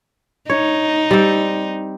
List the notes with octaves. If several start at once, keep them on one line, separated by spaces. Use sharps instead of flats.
D#4 C#5
G3 C4